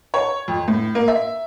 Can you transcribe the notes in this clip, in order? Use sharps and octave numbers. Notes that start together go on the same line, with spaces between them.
C#5
F2
A2
A#3
E5